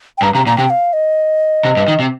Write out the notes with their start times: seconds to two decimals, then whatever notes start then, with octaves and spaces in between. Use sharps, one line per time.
0.18 G5
0.22 G2 A#5
0.35 C3 A#5
0.47 A#2 A#5
0.58 C3 G5
0.70 F5
0.93 D#5
1.65 C3
1.77 G2
1.88 D#3
2.00 C3